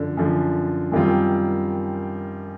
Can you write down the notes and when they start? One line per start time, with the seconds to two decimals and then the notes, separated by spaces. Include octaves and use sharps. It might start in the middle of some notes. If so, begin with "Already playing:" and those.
Already playing: F#2 D3 F3
0.17 F#2 D3 F3
0.92 F#2 D#3 G3 C4 F4